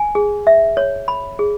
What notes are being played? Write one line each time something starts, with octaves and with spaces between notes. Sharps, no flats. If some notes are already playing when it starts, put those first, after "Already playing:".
Already playing: G#5
G#4
E5
C#5
B5
G#4